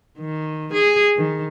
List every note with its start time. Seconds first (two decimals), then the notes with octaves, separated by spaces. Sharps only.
0.18 D#3
0.74 G#4
1.17 D#3